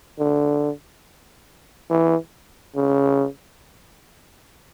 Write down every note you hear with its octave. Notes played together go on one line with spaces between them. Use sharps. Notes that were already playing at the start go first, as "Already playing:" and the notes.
D3
E3
C#3